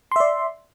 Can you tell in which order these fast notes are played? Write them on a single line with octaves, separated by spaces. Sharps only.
C6 E5 D5